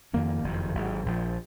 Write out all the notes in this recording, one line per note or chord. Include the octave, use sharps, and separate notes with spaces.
F2 D#3 A#3 C#4
F#1 F2 D#3
G#1 G#2 F#3
A#1 A#2 F3